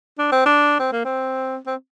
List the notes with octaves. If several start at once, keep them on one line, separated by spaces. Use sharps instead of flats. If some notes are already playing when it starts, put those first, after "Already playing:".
D4
C4
D4
C4
A#3
C4
C4